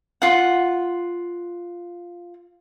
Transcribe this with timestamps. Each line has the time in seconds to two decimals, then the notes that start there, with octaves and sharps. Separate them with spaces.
0.22 F4 F#5